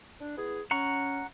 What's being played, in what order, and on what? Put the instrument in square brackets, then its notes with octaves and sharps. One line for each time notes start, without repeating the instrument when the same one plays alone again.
[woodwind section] D4
B3 E4 G#4
[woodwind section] C#4 [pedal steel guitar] F#5 A#5 C#6